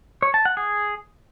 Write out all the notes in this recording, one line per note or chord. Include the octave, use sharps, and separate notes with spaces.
C#5
A5
F#5
G#4